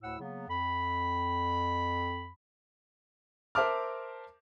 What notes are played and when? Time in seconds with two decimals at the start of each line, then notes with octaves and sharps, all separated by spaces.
0.02 D2 A2 E4 F#5 E6
0.20 C#3 F#3 A#3 B3
0.49 F2 B5
3.55 A#4 C5 E5 A5 D6 F6